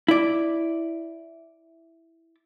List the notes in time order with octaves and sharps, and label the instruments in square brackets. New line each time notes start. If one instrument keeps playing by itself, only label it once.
[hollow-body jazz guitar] E4 D5